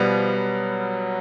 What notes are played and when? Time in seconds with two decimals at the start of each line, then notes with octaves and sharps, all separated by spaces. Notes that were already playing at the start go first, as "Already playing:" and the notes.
Already playing: B2 F3 G3 B3
0.37 F#3